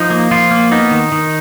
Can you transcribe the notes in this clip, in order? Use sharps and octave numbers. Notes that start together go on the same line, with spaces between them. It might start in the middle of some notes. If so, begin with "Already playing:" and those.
Already playing: F3 D#4
A#3
F3 F4
A#3
B3 D#4
D#3
D#3